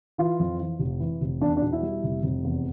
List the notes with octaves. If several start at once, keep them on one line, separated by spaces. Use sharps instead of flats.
E3 F4
F2
E3
F1
E3
F1
E2 D4
D4
B2
E4
G3
F1
F1
E2